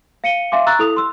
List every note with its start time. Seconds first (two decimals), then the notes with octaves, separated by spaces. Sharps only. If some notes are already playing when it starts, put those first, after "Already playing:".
0.24 F5 C#7 D#7 G7
0.52 E5 F5 G#5 C6 D6
0.67 A#5 C#6 E6 F#6 A6
0.79 E4 A4 D#6 F7
0.96 C6 E6